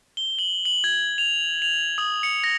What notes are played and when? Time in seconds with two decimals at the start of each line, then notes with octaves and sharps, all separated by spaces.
0.17 G7
0.39 F#7
0.65 F#7
0.84 G#6
1.18 F7
1.62 F7
1.98 D#6
2.23 C#7
2.44 A#6